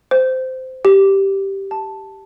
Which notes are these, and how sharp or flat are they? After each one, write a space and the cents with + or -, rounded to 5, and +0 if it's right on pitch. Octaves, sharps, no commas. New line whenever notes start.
C5 -15
G4 -5
A5 +0